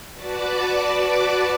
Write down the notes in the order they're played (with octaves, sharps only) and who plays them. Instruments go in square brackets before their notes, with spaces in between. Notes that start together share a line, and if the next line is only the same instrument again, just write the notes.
[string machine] F#4 B4 D5 A5 D6